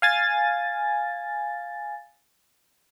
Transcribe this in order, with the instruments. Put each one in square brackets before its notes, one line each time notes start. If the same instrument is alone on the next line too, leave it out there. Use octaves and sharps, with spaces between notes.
[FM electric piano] F5 G#5 A6